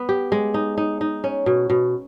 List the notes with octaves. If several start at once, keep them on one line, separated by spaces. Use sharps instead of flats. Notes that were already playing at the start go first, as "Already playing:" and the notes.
Already playing: B3
G4
G#3
D#4
D#4
D#4
C#4
B2
B2